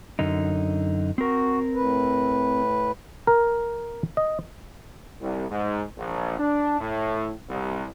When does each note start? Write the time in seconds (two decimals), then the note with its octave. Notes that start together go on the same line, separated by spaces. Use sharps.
0.19 F#2 D3 D#4
1.18 C4 F#4 A#4
1.74 A2 B4
3.27 A#4
4.17 D#5
5.21 C2
5.51 G#2
5.98 A#1
6.39 D4
6.80 A2
7.50 C2